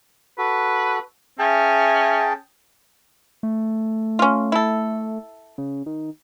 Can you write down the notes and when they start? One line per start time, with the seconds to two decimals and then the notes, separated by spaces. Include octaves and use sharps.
0.38 F#4 A4 B4
1.39 C#4 G#4 E5 G5 A5
3.43 A3
4.19 C#4 F4
4.52 E4 A4
5.58 C#3
5.86 D#3